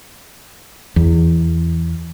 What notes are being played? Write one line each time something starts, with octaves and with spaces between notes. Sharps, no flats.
E2